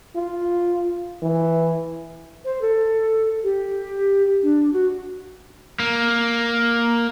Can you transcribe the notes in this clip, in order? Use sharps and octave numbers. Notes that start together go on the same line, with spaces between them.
F4
E3
C5
A4
G4
D4
F#4
A#3